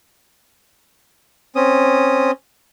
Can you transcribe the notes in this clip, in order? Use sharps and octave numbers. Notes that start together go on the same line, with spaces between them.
C4 C#4 D#6